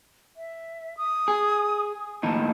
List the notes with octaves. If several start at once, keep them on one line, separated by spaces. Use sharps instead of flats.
E5
D#6
G#4
D#2 A2 D#4 A5